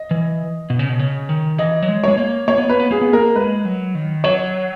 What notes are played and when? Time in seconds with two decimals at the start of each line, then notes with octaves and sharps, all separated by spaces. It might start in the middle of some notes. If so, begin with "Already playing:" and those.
Already playing: D#5
0.11 E3
0.70 B2
0.79 C#3
0.89 B2
0.99 C#3
1.29 D#3
1.58 E3 D#5
1.82 F#3
1.88 G#3
2.04 G#3 C#5
2.17 A#3
2.48 A#3 C#5
2.58 B3
2.68 A#3 B4
2.80 B3
2.91 A#3 G#4
3.01 B3
3.12 A#3 A#4
3.36 G#3 B4
3.65 F#3
3.95 D#3
4.24 F#3 C#5